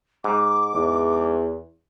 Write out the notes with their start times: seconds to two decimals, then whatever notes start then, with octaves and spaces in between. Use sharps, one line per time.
0.24 G#2 D6
0.74 E2